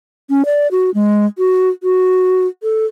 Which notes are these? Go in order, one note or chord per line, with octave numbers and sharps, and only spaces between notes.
C#4
D5
F#4
G#3
F#4
F#4
A4